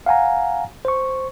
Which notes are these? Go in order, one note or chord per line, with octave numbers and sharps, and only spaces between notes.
F5 F#5 G#5 A#5
C5 C#6